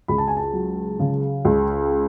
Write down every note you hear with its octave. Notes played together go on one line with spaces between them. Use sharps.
C#2 B5
A5
G#5
A5
F#3
C#3
C#2